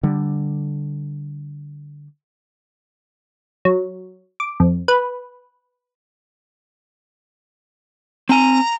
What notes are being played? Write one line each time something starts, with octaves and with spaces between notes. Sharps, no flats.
D3 G3
F#3
D6
F2
B4
C4 G#5 A#5